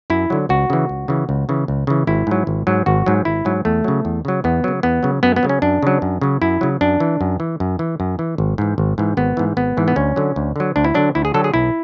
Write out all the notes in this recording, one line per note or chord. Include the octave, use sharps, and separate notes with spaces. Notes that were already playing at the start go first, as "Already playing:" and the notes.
F#2 E4
D3 F#3
C#2 F#4
C#3 E3
C#2
C#3 E3
C#2
C#3 E3
C#2
C#3 E3
G#1 E4
G#2 F#3
G#1
G#2 F#3
G#1 F#4
G#2 F#3
G#1 E4
G#2 F#3
E2 A3
C#3 F#3
E2
C#3 F#3
E2 B3
C#3 F#3
E2 B3
C#3 F#3
F#2 B3
B3
C#3 F#3
C#4
F#2 D4
C#3 F#3
F#2
C#3 F#3
F#2 E4
C#3 F#3
F#2 D4
E3
F#2
E3
F#2
E3
F#2
E3
G#1
G#2 E3
G#1
G#2 E3
G#1 B3
G#2 E3
G#1 B3
G#2 E3
B3
D2 C#4
D3 F#3
D2
D3 F#3
D2 D4
E4
D3 F#3 D4
D2 E4
G#4
D3 F#3 A4
G#4
B1 E4